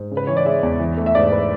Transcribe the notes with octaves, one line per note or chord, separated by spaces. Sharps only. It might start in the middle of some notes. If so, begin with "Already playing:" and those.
Already playing: G#2
C#3
B4
E3 C#5
D5
G#3 E5
E2
E3
A3
E5
G#2 D5
B4